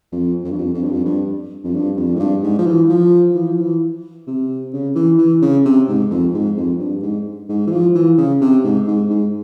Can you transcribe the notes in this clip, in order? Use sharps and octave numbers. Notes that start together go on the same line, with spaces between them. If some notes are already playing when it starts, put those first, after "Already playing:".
F2
F2
G2
F2
F2
G2
F2
G2
F2
G2
F2
G#2
G2
G#2
F3
E3
F3
E3
F3
E3
C3
C#3
E3
E3
C#3
C3
G#2
F2
G#2
F2
G2
G#2
G#2
E3
F3
E3
C#3
C3
G#2
G#2
G#2